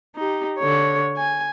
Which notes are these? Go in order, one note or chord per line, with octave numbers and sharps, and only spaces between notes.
D#4 G4
D3 C#5
G#5